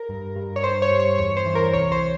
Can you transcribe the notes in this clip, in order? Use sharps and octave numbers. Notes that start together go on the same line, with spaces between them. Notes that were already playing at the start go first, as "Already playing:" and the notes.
Already playing: A#4
G2
G2
C#5
G2 C5
C#5
G2
C#5
E2 C#5
C5
E3
A#4
C2 C#5
C5